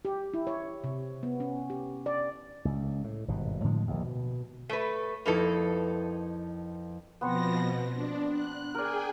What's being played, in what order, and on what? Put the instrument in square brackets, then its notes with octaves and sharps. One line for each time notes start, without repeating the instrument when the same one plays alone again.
[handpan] G4
E4
C#5
C3
B3
C#4
G4
D5
[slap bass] C#2
A2
G#1 G2 B2
A2 D3 F3 G#3
A#1 D#2
B2
[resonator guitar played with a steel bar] A3 B4 [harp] C#5
[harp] F2 E4 B4 [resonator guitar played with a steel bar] A#3 D#4 A4
[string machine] B2 F3 A#6 [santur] B3 C4 C#6
[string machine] B2
D4
F#6
[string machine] G#4 G5 G#5 [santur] A#4 D5